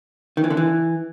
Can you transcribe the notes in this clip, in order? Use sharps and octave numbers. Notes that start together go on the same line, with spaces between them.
D#3
E3
D3
E3